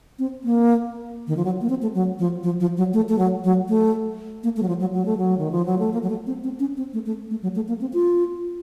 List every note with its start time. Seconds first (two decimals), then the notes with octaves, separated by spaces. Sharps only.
0.19 C4
0.44 A#3
1.27 D#3
1.37 F3
1.45 F#3
1.61 A#3
1.69 C4
1.82 A3
1.95 F#3
2.19 F3
2.43 F3
2.60 F3
2.77 F#3
2.93 A3
3.09 A3
3.19 F#3
3.44 F#3
3.69 A3
4.43 A#3
4.57 A3
4.63 F#3
4.68 F3
4.80 F#3
4.93 F#3
5.05 A3
5.17 F#3
5.38 D#3
5.51 F3
5.66 F#3
5.79 A3
5.93 A#3
6.03 F#3
6.10 A3
6.27 C4
6.44 C4
6.59 C#4
6.77 C4
6.93 A3
7.06 A3
7.31 A3
7.43 F#3
7.56 A3
7.68 A#3
7.81 C4
7.93 F4